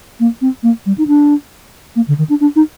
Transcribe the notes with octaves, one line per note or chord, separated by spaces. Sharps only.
A#3
C4
A#3
G3
D#4
D4
A#3
D3
D#3
D4
D4
D#4